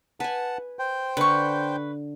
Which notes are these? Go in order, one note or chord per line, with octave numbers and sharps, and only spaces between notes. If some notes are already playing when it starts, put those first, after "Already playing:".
B4 F#5 G#5 A5
C5 G5
D3 B4 C#6